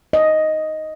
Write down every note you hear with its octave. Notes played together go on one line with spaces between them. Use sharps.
D#5